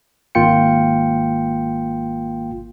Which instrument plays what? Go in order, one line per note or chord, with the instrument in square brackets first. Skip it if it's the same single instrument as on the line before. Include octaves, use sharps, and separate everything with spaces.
[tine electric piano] G#1 A#3 F4 G5 C#7